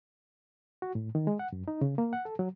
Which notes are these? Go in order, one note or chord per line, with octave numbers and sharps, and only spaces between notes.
F#4
A2
D#3
G#3
F#5
F#2
D#4
C#3
A#3
F#5
A4
F#3